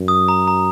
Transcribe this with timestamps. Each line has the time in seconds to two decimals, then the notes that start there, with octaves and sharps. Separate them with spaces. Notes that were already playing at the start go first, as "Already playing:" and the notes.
Already playing: F#2
0.08 D#6
0.28 A#5
0.48 A#5